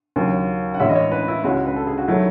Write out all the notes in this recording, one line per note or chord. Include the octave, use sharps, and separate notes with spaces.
D#2 C#3 F#3
F#5
A2 E3 G#3 C#4 E5
D#5
C#5
B4
E4
C#2 C#3 G#3 C#4 F#4
B4
A4
G#4
F#4
D#3 F#3 A3 E4